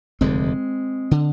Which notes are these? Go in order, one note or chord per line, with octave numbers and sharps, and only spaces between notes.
F1 D#2 D3 G#3 C4
D3